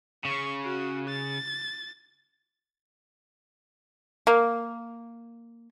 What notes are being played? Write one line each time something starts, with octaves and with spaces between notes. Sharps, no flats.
C#3 C#6
F#4
A6
A#3